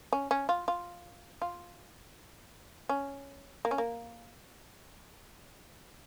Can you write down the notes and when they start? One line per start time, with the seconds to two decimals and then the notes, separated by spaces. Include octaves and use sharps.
0.13 C#4
0.31 C#4
0.49 F4
0.68 F4
1.42 F4
2.89 C#4
3.65 A#3
3.71 C#4
3.78 A#3